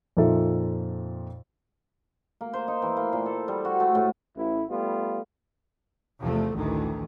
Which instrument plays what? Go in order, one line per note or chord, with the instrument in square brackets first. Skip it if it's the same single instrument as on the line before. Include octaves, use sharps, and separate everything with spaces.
[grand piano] F2 A#2 D#4 A4 E5
[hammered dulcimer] A#3
C5
D#4
E3
A#3
A#2
A4
G3
F#4
A3
A2
[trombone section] A1 E4
G3 A3 B3 F4
[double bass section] E2 C3 F3 A3
A1 D2 D#3 E3